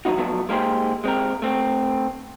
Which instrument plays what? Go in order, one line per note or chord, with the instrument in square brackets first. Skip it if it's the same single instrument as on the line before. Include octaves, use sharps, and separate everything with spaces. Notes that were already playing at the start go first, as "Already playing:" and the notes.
[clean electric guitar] D#3 F#3 A3 B3 D#4 F#4
F3 F#3 A3 B3
G#3 A#3 D#4 G4 G#4 C5
G#3 C4 G4 A#4
A3 C4